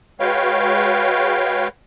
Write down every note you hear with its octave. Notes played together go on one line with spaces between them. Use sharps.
G#3 F#4 B4 C#5 F5 G5